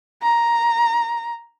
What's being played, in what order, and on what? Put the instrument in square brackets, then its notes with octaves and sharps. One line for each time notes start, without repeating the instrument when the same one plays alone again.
[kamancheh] A#5